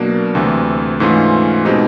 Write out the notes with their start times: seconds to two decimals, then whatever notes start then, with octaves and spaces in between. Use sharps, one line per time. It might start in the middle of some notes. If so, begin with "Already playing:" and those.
Already playing: B2 F#3 A#3 D4
0.35 D2 C3 E3
1.00 G#2 E3 A3 C#4 F4
1.65 B2 G#3 C4 D#4 G4